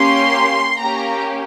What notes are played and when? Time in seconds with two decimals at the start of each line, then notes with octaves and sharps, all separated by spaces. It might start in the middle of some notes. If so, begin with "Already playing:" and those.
Already playing: A#3 C#4 G4 C6
0.79 A#3 C#4 G4 A#5